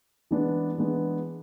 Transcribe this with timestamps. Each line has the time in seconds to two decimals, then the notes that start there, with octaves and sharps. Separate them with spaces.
0.31 E3 G#3 B3 D4
0.78 E3 G#3 B3 D4